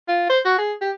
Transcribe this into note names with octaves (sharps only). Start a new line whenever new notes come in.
F4
C5
F#4
G#4
G4